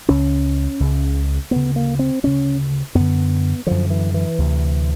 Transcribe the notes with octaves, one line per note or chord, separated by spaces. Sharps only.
C#2 C#3 C#4
C#2 C#3
D2 C#3 B3
A#3
C4
D2 C#3 C#4
F#2 D3 B3
F#2 D3 F3
E3
E3
D2 C3